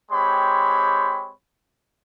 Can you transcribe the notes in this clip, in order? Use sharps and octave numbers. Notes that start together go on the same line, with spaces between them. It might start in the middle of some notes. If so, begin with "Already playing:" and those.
G#3 C4 G4 C#5 B5